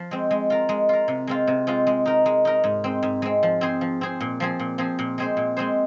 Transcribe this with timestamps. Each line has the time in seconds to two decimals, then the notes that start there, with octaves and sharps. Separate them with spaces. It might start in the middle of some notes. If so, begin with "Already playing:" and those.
Already playing: F3
0.11 G#3 C4
0.31 G#3
0.50 F4 A#4
0.69 G#3
0.89 F4 A#4
1.08 C3
1.27 G#3 C4 F4
1.47 C3
1.67 G#3 C4 F4
1.87 G#3
2.06 D#4 A#4
2.26 G#3
2.45 D#4 A#4
2.64 G#2
2.84 G#3 C4
3.03 G#2
3.22 G#3 C4
3.43 F3
3.61 C4 G#4 C5
3.81 F3
4.01 C4 G#4 C5
4.20 A#2
4.40 F3 C4 G#4
4.59 A#2
4.78 F3 C4 G#4
4.99 A#2
5.18 G#3 C4 G#4 C5
5.37 A#2
5.57 G#3 C4 G#4 C5